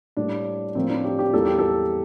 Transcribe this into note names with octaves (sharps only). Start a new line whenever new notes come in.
A2 G3 A#3 D4
A2 F3 A#3 C4
D4
G4
G4
E2 E3 G3 A#3 A4
G4
A4